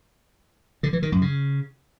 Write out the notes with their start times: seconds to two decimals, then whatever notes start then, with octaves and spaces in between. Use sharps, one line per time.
0.83 D3
0.93 E3
1.02 D#3
1.12 F#2
1.22 C#3